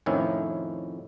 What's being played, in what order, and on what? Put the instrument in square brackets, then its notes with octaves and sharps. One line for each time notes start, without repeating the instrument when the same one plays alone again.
[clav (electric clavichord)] F2 A2 D#3 F3 C#4 E4